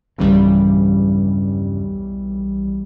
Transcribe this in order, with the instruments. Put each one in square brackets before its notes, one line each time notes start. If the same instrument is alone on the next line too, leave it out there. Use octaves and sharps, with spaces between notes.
[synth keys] B1 E3 G3 [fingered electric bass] E2 G2 C#3